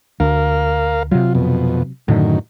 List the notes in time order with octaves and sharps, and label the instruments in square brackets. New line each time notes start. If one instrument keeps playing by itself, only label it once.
[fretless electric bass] D2 [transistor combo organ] A#4 F5
[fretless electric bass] C3 F#3 [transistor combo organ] F4
[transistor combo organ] F2 B2
[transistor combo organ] F#2 D#3 [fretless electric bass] A2 D3